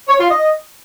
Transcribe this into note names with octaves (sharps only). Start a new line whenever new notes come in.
C#5
F4
D#5